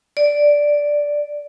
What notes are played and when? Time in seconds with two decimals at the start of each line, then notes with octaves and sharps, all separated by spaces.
0.17 D5